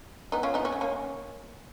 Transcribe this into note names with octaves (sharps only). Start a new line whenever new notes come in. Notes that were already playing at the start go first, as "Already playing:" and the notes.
B3 D#4
C#4 F4
B3 D#4
C#4
B3
A#3 C#4